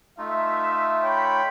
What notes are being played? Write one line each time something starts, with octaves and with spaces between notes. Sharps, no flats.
A3 D#4 F4 E5
C#5 G5 B5